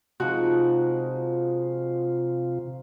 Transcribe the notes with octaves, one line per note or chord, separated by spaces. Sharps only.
C3 F3 G#3 D#4 F4 F#4